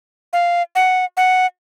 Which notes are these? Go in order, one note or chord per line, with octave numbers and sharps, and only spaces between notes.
F5
F#5
F#5